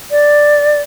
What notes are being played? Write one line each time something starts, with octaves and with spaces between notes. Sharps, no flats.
D5